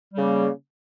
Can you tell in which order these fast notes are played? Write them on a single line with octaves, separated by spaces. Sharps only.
G3 C#3 A#3